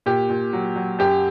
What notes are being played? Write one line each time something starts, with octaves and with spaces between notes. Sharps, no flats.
A#2 G4
A#2
F#3
F#3
F#2 G4